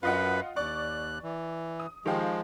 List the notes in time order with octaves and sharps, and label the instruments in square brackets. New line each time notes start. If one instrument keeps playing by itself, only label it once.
[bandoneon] F#2 B4 [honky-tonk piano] F4 D#5 F#5
[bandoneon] D#2 F#6 [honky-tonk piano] D5 C#6
[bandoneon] E3
[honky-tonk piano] D#6
[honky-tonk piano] D#3 G4 F5 [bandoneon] F3 G#3